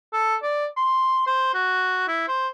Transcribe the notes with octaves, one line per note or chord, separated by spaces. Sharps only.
A4
D5
C6
C5
F#4
E4
C5